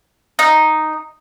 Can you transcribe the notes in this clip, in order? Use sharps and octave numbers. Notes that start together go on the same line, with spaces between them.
D#4